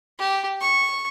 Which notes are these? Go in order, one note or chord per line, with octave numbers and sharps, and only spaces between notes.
G4
C#6